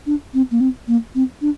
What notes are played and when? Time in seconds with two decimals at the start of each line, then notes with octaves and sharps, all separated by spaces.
0.06 D4
0.34 C4
0.51 A#3
0.60 C4
0.88 A#3
1.15 C4
1.41 D4